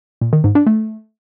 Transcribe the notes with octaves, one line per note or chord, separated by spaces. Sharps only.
A#2
D#3
G#2
D4
A3